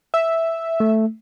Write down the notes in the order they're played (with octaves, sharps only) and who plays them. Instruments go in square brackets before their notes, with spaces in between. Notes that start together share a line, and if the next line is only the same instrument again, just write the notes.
[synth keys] E5
[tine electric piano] A3